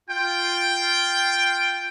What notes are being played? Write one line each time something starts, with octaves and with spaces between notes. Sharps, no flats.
F4 G5